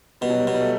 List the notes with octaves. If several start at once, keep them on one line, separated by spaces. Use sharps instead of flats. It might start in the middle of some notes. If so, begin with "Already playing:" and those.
B2 G3
F#3
G3
B2
G3
A3